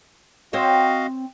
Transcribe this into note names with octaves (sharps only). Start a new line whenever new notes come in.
C4 F#4 C5 C#5 D#5 F5